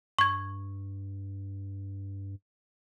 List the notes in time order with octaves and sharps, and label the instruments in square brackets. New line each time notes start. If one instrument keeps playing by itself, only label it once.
[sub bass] G2 [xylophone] C#6 G#6